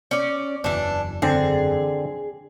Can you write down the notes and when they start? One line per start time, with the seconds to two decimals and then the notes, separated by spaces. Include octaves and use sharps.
0.11 C#4 D5
0.64 F#1 E2 E3 D4
1.22 D3 C4 D4 G#4